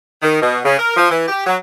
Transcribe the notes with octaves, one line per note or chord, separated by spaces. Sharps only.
D#3
B2
C#3
A#4
F3
E3
G4
F#3